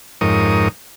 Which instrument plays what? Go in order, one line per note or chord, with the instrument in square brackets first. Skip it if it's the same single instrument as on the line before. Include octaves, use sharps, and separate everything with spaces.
[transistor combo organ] F2 G#2 D#4 A#4 C#5 D#6